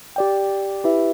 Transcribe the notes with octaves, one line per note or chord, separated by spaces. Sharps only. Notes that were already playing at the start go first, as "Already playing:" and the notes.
G4 D5 G5
E4 G4 B4 E5